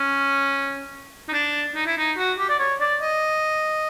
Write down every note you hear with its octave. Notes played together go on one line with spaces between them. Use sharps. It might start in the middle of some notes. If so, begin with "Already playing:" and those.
Already playing: C#4
D#4
D4
D#4
E4
D#4
F#4
G4
D5
C#5
D5
D#5